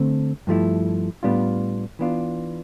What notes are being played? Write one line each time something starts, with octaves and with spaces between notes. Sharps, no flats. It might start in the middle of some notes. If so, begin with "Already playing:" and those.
Already playing: D3 A3 C4
G2 F3 A3 E4
A2 G3 B3 D4 F4
E3 B3 D4 F4